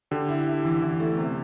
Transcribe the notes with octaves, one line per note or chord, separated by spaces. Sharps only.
D3 G4
E4
E4
E3
E3
A3
C3